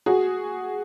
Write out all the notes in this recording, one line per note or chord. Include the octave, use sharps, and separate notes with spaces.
F#4 G#4